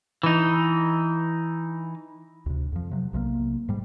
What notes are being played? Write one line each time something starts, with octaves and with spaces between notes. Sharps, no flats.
E3 D#4
D2 C3
F2 F3
C3 F#3
B1 C3 E3 A#3
G#2 G3